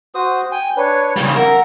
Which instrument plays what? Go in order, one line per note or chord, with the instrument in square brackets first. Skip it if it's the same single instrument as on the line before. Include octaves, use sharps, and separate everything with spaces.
[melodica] F#4 C5 D#6
G5 G#5
[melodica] D4 B4 [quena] C#5
[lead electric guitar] C#3 G3 [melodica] F5
[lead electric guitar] A#4 [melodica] E5 [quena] F#5